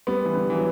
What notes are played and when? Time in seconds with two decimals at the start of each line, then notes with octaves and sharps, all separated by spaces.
0.07 G3 B3
0.25 E3
0.35 D3
0.50 E3
0.55 F#3